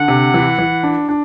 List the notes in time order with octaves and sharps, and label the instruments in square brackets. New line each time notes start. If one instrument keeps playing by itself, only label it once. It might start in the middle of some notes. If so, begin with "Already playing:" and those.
Already playing: [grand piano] D3 [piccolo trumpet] F#5
[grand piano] C3
E3
E3
D4
D4